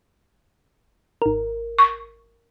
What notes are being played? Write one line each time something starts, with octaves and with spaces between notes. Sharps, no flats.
G#1 A#4
C#6